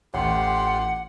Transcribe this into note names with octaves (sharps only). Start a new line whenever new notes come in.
A1 F4 G4 F#5 C6